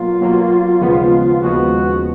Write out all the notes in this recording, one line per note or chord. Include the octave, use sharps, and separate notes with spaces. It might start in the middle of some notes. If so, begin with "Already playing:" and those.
Already playing: B2 F#3 A#3 F4
B2 F#3 A#3
D#2 C#3 F3 G#3 B3
D#2 C#3 F3 G#3 B3 F#4